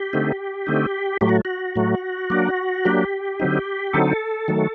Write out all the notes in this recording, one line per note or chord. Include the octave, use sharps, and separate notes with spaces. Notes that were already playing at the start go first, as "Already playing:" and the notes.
Already playing: G4
D3 A3 C4 D#4
D3 A3 C4 D#4
A2 F#3 A3 G4
F#4
F#4
A2 F#3 A3
F#3 A#3 D4
F#3 A#3 D4 G4
D3 F#3 C4 D#4
D3 F#3 C4 D#4 A4
D#3 F#3 A3